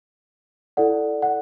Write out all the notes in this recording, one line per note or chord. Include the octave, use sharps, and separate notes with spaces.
E4 A4 D5 F#5
F#5